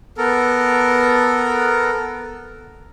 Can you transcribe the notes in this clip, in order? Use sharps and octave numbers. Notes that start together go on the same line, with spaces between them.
B3 A4 A#4